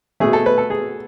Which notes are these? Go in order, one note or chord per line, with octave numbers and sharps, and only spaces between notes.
B2 A3 G#4
A4
B4
A4
G#4